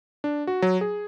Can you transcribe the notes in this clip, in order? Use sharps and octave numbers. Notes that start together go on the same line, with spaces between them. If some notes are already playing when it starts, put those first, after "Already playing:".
D4
F#4
F#3
G#4